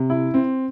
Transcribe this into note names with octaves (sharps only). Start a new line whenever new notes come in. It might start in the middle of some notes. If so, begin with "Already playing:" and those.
Already playing: C3
E4
C4